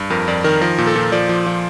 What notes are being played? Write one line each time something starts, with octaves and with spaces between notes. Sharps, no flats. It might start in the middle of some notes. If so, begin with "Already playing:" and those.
Already playing: G2
F2 A#4
F2 D5
D#3 A#4
F3 A#4
A#2
A4
A#2
F3 D5
F3
F3